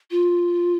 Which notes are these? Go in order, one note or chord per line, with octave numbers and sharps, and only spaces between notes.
F4